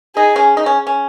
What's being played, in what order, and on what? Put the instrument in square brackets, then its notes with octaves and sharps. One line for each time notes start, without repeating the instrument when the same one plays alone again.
[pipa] D#4 [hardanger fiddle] G#4
[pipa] C#4
D#4
C#4
C#4